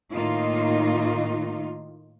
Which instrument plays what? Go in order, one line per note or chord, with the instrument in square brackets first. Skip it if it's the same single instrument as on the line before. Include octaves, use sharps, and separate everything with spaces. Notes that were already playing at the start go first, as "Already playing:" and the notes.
[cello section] A2 D#3 A#3 D#4 F4